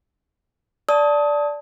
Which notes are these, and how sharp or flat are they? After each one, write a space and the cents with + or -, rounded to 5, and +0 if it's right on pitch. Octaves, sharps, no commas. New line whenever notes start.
D5 -5 A5 +0 D#6 +25